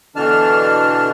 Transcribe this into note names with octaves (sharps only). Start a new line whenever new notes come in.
B2 D3 E3 D4 A5 F6